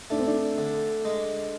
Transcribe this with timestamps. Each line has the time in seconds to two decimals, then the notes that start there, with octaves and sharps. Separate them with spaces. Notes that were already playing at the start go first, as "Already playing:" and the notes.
0.10 A3 D4
0.19 C4
0.27 D4
0.58 D3
1.05 G#3